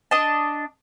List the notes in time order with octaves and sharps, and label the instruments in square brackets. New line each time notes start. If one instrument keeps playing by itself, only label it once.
[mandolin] D4 D#5 A5